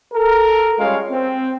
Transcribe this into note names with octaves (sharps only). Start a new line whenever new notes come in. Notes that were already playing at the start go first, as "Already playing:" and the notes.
A4 A#4
G3 G#3 C#4 F4 C#5 F5
C4